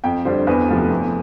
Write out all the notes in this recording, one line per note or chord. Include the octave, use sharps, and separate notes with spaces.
F2 G5
D3 G3 D4 C5
E2 B4
C3 F3 A3
E2